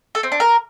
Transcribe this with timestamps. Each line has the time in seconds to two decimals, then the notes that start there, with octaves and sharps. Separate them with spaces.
0.15 A4
0.23 C4
0.32 D4
0.40 A#4